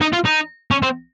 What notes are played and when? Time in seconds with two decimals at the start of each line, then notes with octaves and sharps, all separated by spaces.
0.01 D#4
0.13 F4
0.25 D#4
0.71 C#4
0.83 C4